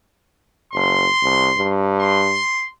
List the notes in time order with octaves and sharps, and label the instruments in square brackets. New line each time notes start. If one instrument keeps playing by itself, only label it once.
[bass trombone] F#1 [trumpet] C6
[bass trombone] C2
G2
[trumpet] C6